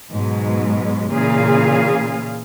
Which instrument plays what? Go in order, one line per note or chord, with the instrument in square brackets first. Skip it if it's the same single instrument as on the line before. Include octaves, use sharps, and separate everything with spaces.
[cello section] G#2 B2 F#3 G#3
A#2 C#3 E3 G#4 F5